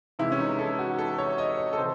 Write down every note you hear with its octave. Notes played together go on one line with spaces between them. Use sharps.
C3 E3 G#3 E4
C#4
D#4
A4
F#4
A4
C#5
D#5
C#5
A4
C3 E3 C5